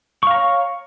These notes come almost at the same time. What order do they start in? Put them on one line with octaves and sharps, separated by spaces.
C#6 F5 A#5 C#5